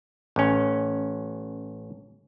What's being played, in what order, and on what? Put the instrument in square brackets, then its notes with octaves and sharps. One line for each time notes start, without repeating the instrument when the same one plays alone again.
[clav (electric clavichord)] A1 C#4